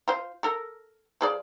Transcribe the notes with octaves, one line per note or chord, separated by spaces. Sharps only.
F4 C5
A4 A#4
F3 G#4 D5